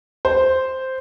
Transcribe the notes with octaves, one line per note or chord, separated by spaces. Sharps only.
C5